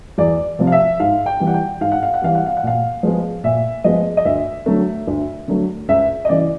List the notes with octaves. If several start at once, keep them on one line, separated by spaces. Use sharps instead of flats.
E2 D5
C3 F3
F5
E5
G#2 F5
G5
E3 G3
F#5
G5
G#2 F5
F#5
F5
F#5
E3 G3 F5
F#5
F5
F#5
A#2 F5
F3 G#3 B3
A#2 E5
F3 G#3 B3 D#5
D#5
D2 E5
D3 F#3 A3
D2
D3 F#3 A3
C#2 E5
D#5
C#3 E3 D5